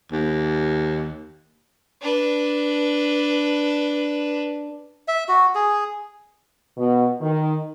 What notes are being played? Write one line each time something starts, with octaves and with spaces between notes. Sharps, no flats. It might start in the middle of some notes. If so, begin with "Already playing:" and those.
D#2
D4 B4
E5
F#4
G#4
B2
D#3